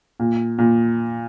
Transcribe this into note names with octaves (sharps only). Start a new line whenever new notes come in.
A#2
A#2